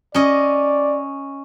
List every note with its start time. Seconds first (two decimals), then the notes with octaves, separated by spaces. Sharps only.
0.14 C#4 D5 D#5